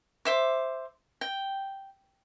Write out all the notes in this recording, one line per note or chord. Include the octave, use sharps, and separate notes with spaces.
C5 E5 D6
G5